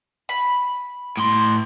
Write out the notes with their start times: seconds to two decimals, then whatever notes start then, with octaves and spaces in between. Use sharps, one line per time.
0.29 B5
1.17 A2 C6